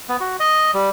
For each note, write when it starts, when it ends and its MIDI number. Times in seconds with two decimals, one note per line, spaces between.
0.09 0.17 59
0.20 0.37 66
0.40 0.71 75
0.74 0.90 55